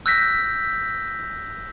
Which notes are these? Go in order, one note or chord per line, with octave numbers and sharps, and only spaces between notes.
E6 F#6 G6 A#6 B6